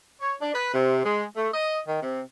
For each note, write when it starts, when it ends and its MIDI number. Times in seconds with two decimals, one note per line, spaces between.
0.21 0.35 73
0.41 0.52 62
0.54 0.72 71
0.74 1.02 48
1.04 1.24 56
1.36 1.48 57
1.53 1.79 75
1.87 1.98 51
2.03 2.21 48